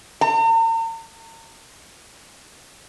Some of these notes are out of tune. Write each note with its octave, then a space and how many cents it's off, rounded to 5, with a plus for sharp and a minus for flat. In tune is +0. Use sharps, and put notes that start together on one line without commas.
A#5 -45